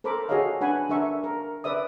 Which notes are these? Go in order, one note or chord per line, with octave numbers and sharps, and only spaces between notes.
A4 A#4 C5 B5 D6
F#4 G#4 A4 C#5 D#5 F5
D4 B4 F#5 G#5 B5
D4 A#4 E5 C#6
A#4
B4 D5 E5 D#6